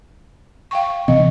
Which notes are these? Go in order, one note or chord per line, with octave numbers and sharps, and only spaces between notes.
F5 G5 C#6
C3 E3 C4 D#5